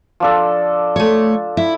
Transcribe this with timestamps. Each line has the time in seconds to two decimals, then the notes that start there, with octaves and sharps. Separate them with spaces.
0.20 F3 D4 A4
0.96 A3 C#5
1.57 E4